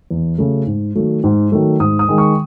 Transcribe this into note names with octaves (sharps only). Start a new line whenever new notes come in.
E2
C#3 F#3 A3
G#2
D#3 F#3 A3
G#2
D#3 F#3 A3
G#2 D#6
D#6
D#3 G#3
C#6